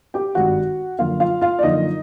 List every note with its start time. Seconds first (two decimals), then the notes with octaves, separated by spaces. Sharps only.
0.14 G4 G5
0.35 G#1 G2 D#3 G3 F#4 F#5
0.99 F#2 D3 F3 A#3 F4 F5
1.20 F4 F5
1.41 F4 F5
1.59 D5
1.63 F#2 D3 F3 A#3 D#4 D#5